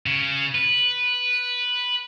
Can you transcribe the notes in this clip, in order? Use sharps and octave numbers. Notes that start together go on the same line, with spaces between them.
C#3
B4